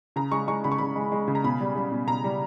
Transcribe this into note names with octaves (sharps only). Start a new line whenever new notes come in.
C#3 A#5
G#3 C#6
G#3 C#6
C#3 B5
C#6
C#3 B5
G#3
G#3
C#3
A#5
B2 B5
G3
G3
B2
B2 A#5
G3